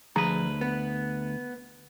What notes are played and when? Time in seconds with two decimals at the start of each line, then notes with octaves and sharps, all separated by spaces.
0.16 D2 F3 G#4 B4 A#5
0.61 B3